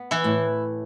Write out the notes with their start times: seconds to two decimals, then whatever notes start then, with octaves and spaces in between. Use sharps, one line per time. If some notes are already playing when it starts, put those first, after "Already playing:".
Already playing: B3
0.11 E3 E4
0.24 A2